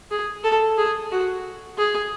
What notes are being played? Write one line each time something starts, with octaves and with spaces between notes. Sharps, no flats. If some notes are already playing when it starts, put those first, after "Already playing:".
G#4
A4
G#4
F#4
G#4